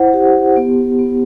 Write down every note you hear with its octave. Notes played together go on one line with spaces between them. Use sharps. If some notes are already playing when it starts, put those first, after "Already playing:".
Already playing: E4 C5 F#5
G4
B3
B3